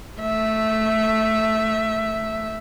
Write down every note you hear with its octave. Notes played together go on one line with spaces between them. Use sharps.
A3 E5